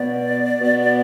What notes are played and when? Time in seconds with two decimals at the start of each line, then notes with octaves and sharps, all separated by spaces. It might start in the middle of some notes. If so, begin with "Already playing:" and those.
Already playing: B2 B3 D5
0.60 B2 B3